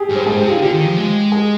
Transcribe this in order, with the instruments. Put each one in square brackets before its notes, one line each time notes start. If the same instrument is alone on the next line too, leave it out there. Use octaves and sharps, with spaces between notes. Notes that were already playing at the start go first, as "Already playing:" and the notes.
Already playing: [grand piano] G4 G#4
[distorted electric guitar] G2
[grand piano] C5
[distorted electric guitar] G#2 [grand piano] G#4
[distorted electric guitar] C3 [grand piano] G4
[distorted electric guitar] D3 [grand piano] F4
[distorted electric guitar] D3 [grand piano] G4
[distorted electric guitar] D#3
F3
G#3
[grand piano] G#4